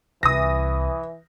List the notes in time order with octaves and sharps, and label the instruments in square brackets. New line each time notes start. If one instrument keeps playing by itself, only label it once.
[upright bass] C2 [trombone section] E3 [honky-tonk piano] D#6 A#6